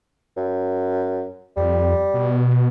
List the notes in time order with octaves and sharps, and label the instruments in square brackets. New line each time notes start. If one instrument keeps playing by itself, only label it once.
[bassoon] F#2
[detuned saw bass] F2 [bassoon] G3
[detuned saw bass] B2